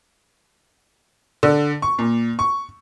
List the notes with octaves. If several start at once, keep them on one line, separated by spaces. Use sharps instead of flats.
D3
C#6
A#2
C#6